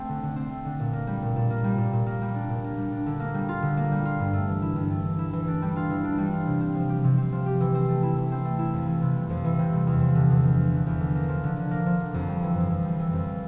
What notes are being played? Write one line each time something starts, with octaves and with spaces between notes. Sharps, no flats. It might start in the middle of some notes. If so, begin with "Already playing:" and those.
Already playing: A3 C4
D3
D3
C4
A3
D3
A#2
A#3
G3
A#2
A#2
A#3
G3
A#2
A#2
A#3
G3
D4
A#2
A#3
G3
D4
D3
A#3
G3
F4
D3
A#3
G3
F4
G2
A3
E3
E4
G2
A3
E3
E4
E3
D4
G3
F4
E3
D4
G3
F4
C3
C4
F3
G4
C3
C4
F3
G4
E3
C4
A3
E4
E3
C4
A3
E4
F2
E3
C3
G3
F2
E3
C3
G3
E2
F3
D3
E2
E2
F3
D3
E2
D3
A#3
F3
D3
D3
A#3
F3
D3
F2
G3
E3
F2
F2
G3
E3
F2